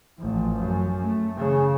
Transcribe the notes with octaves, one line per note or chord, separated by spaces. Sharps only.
A1 F3
F#2
A3
C#3